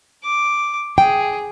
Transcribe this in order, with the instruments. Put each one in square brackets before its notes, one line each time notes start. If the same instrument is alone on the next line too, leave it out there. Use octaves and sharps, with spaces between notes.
[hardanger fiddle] D6
[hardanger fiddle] G#4 [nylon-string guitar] G5